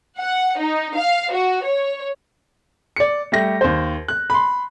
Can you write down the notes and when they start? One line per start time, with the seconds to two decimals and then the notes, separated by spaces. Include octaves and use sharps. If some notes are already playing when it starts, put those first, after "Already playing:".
0.18 F#5
0.58 D#4
0.95 F5
1.31 F#4
1.64 C#5
2.96 D5 C#7
3.32 G3 A3 G4 A#6
3.61 D#2 C5
4.08 F#6
4.30 B5 C6